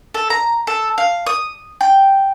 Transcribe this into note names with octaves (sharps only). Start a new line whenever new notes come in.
A4
A#5
A4
F5
D#6
G5